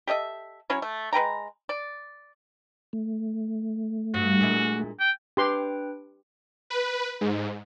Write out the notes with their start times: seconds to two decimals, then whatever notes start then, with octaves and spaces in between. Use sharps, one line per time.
0.07 G4 A4 D#5 E5
0.70 F#3 C#4 E4 C#5
0.82 A3
1.13 G#3 B4 G5 A#5
1.69 D5
2.93 A3
4.14 G2 F#4
4.40 A#2 G#3 E4
5.00 G5
5.37 D4 G4 B4 G5 C6
6.70 B4
7.21 G#2